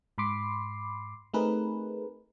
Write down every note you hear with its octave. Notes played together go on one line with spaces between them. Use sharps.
G#2 B5 C6 D6 C7
A3 C4 D#4 G#4 A#4 B4